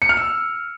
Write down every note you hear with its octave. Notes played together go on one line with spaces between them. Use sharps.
C#7
F6
E6